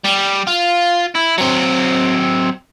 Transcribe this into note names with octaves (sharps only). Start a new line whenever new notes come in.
G3
F4
E4
F#3 C4